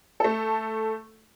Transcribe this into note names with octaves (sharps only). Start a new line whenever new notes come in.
A3 A4